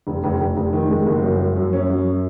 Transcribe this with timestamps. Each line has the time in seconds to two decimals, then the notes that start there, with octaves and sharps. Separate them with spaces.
0.07 F1
0.24 F1
0.40 F1
0.57 F1
0.73 D#3
0.90 G#3
1.06 F#1
1.23 F#2
1.39 F#2
1.56 F#2
1.73 C#4
1.90 F#2